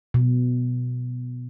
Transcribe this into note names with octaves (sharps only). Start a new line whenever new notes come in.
B2